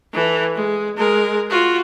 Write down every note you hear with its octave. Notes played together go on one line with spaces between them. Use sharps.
E3 A4
G#3
G#3 A#4
F4 F#4